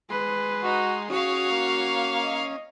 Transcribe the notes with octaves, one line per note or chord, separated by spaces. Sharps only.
G#3 B4 C6
D#4 F#4
C#4 F#4 G#4 C#5 F5
A#3
D#5